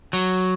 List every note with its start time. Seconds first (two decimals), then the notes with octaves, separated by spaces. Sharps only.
0.13 F#3